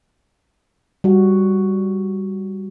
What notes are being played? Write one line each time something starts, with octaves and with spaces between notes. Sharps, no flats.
G3 F#4